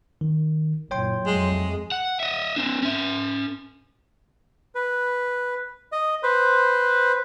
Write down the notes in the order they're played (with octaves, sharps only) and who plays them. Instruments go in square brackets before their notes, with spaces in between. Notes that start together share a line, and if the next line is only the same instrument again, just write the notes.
[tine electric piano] D#3
[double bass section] F#1 A#2 [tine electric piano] C#5 G5 C6
[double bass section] F2 F#3 A3 [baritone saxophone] G#3
[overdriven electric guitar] F#5
D#5 E5
C4 D4
C#4 E5
[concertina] B4
D#5
B4 C5